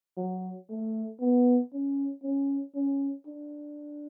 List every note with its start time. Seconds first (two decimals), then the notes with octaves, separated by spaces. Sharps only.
0.17 F#3
0.70 A3
1.20 B3
1.73 C#4
2.23 C#4
2.75 C#4
3.27 D4